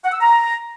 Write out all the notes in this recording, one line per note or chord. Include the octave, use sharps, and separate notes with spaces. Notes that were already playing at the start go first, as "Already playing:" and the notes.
F#5
E6
A#5